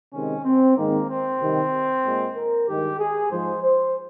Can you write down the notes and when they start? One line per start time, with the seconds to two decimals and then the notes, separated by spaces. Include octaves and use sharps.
0.13 C3 D#3 G#3 C#4
0.45 C4
0.77 G#2 D#3 G#3 A#3
1.09 C4
1.40 C3 D#3 G3
2.04 A#2 G#3
2.36 A#4
2.68 G2 D#3 G#3 G4
3.00 G#4
3.31 G#2 F3 G#3 C5
3.63 C5